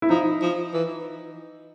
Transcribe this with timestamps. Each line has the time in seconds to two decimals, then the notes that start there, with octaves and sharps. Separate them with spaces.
0.02 E4
0.10 F3 D#4
0.42 F3
0.74 E3